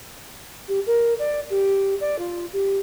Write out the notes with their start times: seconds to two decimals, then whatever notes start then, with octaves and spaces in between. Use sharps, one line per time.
0.68 G4
0.87 A#4
1.19 D5
1.50 G4
2.01 D5
2.19 F4
2.53 G4